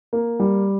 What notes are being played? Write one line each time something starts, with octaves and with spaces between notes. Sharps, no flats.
A#3
G3